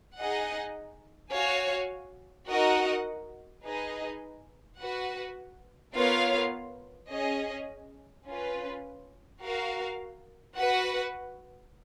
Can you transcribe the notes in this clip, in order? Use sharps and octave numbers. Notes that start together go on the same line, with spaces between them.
D#4 G#4 D#5 F#5
F#4 C#5 F5 G#5
D#4 F#4 A#4 D#5 F#5
D#4 G#4 B4 D#5
F#4 B4 F#5
B3 F4 A#4 C#5 F5
C#4 G#4 D#5
C#4 F4 B4
F#4 A#4 F5
F#4 B4 F#5